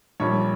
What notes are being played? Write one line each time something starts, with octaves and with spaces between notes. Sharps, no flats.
A#1 A#2 G3 C#5